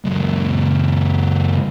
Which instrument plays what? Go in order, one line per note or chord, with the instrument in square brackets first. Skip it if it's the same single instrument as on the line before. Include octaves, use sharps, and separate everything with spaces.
[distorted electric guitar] C#2 F#2